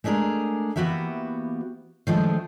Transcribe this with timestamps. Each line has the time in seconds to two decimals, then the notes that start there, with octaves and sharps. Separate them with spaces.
0.04 G#3 A3 D4 G#4 A#4
0.76 E3 A#3 B3 F#4 G4 E5
2.07 D#3 F3 G#3 A3 D4